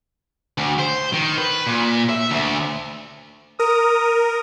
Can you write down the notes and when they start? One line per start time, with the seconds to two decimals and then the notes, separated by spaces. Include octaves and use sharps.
0.58 D2
0.79 C5
1.13 D#3
1.38 B4
1.67 A#2
2.09 E5
2.31 D2
3.59 A#4 D#6